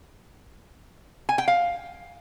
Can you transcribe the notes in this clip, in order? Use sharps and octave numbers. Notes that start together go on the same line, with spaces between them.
G#5
G5
F5